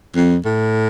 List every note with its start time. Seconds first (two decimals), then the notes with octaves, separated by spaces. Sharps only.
0.17 F2
0.45 A2